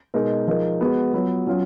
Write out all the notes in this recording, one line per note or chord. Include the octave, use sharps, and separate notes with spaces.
B2 G#3 D#4 A#4
F3 G#3 D#4 A#4
G#3 B3 F#4 B4
F#3 B3 F4 B4
F#3 C#4 F4